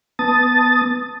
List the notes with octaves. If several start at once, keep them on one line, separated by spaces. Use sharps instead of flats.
B3 A5 D#6 A6